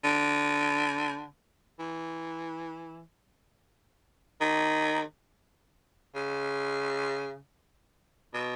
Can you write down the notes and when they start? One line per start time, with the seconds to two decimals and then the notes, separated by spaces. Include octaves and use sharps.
0.04 D3
1.79 E3
4.41 D#3
6.15 C#3
8.34 B2